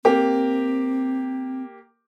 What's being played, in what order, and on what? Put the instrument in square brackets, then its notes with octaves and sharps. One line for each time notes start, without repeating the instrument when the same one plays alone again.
[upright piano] A#3 G4 [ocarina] C4